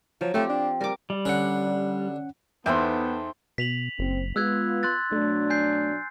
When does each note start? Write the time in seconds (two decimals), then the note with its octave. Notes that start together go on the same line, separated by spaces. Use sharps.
0.21 F3 F#3
0.34 F3 A3 C4 G4
0.50 D4
0.81 G3 A#4 D6
1.10 G3
1.25 D3 C#4 F#5
2.66 E2 B3 D#4 A4 C5 E5 G5
3.58 B2 B6 F7 F#7
3.99 F#1 C4
4.36 G#3 B3 F4 E6 F#6 G#6
4.83 C6 F#6 A6
5.12 B2 F#3 A3 D4
5.50 G#5 G6 C7